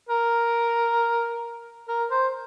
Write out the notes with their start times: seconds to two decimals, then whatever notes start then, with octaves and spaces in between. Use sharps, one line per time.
0.09 A#4
1.89 A#4
2.11 C5